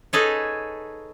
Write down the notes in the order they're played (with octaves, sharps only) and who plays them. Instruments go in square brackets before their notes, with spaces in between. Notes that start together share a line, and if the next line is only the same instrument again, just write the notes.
[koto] D#4 G#4 A4 B4 C#5